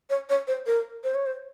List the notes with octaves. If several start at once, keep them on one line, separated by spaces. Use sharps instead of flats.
C#5
C#5
C5
A#4
C5
C#5
C5